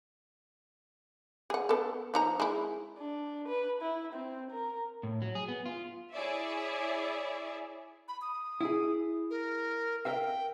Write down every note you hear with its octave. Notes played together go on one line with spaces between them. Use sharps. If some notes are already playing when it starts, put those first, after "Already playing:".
G#4 F#5
B3 A4
F3 D#4 A#5
G#3 E4
D4
B4
E4
C4
A#4
A2
F#3
G#4
B3
F4
E4 G#4 C#5 D5 E5
B5
D#6
E4 G#4
A#4
A#4 E5 F5 G5